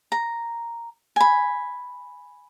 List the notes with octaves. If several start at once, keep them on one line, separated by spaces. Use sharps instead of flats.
A#5
G#5 B5